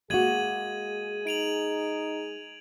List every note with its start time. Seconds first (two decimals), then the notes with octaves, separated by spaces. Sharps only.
0.10 G#3 A#3 F#4 G#4 G#6 D#7 F#7
1.27 D#4 D7 F7 F#7